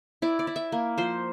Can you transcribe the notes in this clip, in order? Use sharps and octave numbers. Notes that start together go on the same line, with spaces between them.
E4 D5
D5
E4
E5
A#3
F3 C5